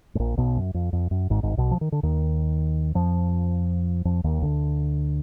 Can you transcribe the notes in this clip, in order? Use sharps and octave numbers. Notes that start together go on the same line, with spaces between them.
G#2
A#1 A#2
B1 B2
F#2
F2
F2
F#2
G#1 G#2
G#1 G#2
B1 B2
F3
D#3
D3
D#2 D#3
F2 F3
F2 F3
D#2 D#3
D2 D3